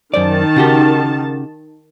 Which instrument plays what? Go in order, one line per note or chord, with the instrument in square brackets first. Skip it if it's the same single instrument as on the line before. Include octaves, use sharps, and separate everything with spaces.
[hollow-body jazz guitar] F#2 C5 D5 [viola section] D#3 A5
[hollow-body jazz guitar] C#3 F#4 G4